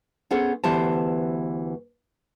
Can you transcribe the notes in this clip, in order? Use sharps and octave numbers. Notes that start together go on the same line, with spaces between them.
B3 C#4 G#4 A4 C5
D2 E3 B3 G4 C5 A5